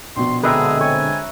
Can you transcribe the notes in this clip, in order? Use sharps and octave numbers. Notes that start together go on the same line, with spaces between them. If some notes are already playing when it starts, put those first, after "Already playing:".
A#1 B2 C6
D3 G#3 C4 G#4 B4 E5 A#5
C#5 G#5